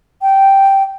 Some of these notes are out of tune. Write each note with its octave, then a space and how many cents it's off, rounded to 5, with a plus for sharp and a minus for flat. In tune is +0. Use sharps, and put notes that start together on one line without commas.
G5 -5